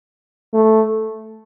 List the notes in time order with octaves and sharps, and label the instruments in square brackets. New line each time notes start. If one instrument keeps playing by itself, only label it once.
[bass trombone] A3